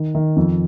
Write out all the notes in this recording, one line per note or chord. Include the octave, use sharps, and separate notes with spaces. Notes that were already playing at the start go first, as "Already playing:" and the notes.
Already playing: D#3
D#3
F2